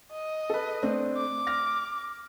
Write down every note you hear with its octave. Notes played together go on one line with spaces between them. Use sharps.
D#5
A4 B4
A3 C4 D4
D6
F6 A#6